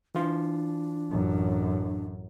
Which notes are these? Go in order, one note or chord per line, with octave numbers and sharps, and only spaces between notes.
E3 D4 F4
A1 F#2